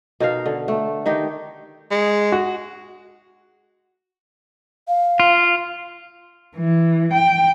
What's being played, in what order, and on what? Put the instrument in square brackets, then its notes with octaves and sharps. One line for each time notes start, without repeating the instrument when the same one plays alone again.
[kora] B2 D#4 A#4 F5
D3
A3
D#3 D#4 G4
[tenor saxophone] G#3
[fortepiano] F#4
[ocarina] F5
[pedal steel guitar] F4
[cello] E3
G5